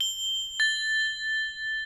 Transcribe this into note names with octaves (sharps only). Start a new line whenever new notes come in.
G7
A6